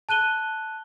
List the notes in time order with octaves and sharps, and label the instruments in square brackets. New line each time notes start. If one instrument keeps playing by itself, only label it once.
[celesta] A5 F#6 D#7 G7